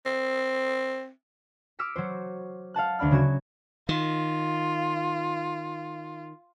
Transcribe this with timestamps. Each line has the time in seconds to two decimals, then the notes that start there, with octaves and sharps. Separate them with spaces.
0.06 C4
1.79 D6 E6 F6 B6 C#7
1.96 F#3 F#4 C5
2.74 F5 F#5 A5 F#6
2.99 D2 D4 D5 B5 F6
3.11 C#3 F#3 F#4 G#6 E7
3.89 D#3 F4